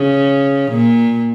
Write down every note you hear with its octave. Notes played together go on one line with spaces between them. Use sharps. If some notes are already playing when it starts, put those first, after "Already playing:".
Already playing: C#3
A#2